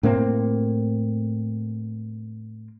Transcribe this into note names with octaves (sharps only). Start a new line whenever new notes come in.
A2 A#3 C4